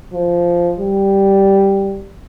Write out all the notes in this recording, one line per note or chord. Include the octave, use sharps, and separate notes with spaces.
F3
G3